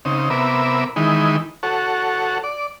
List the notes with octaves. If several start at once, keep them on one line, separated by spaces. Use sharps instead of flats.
C#3 C4 D#4
C3 B3 A#4 E5 B5 D6
D#3 E3 G#3 D#4 B5
F#4 A4 C#5
D5